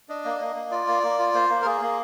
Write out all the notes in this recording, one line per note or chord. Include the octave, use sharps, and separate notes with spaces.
D4 D#5
A#3
A#3
A#3
F4 D5
A#3
A#3
F4
A#3 C5
A#3
A#4
A#3 G#4
A#3